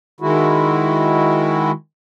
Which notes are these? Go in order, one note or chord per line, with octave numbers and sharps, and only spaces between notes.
D#3 G#3 E4 F#4